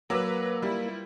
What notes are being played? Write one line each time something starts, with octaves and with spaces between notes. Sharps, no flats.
F#3 A#3 B4 D6 E6
G3 E4 F4